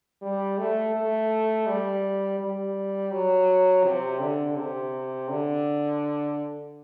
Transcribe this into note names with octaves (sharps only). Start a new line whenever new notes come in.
G3
A3
A3
G3
G3
F#3
C3
D3
C3
D3